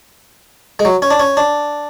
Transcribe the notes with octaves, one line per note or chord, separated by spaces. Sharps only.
G#3
F#3
C#4
D4
C#4
D4